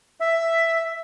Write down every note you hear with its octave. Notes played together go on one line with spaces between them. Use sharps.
E5